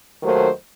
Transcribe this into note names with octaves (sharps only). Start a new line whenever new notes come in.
D#2 D#3 F#3 A3 C5